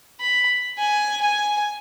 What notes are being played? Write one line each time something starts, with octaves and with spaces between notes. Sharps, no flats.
B5
G#5
G#5